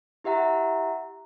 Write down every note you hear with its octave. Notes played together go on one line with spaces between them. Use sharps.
E4 G4 E5 F#5 A#5